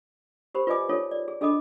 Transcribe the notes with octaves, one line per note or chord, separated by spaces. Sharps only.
G4 A#4 C5 B5
F4 B4 D5 D#5 G#5 D6
D#4 F4 G#4 A4 C#5
D5
G#4
D4 G#4 A4 D#5 B5 D6